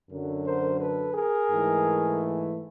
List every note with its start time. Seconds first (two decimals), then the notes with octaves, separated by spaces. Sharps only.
0.10 F#2 D3 F#3
0.45 A#4 C5
0.79 A4 B4
1.14 G#4 A#4
1.50 G#2 E3 A3